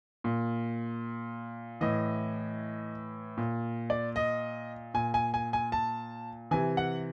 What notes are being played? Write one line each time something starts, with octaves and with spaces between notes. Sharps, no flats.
A#2
A2 E3 D#5
A#2
D5
D#5
A#2 G#5
G#5
G#5
G#5
A5
C3 E3 G#5
F#5